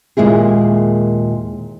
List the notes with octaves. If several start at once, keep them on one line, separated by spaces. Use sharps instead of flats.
D#2 A#2 G#3 E4 G#4